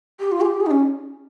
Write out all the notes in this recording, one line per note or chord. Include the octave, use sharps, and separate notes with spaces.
G4
F4
G#4
G4
G#4
D#4
C#4